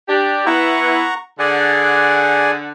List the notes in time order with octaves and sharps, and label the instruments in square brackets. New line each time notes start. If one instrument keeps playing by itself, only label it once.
[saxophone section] D4 G4
[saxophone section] B3 E4 [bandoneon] F#5 A#5 C#6
[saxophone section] D3 F#5 [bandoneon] G#4 D5 G#5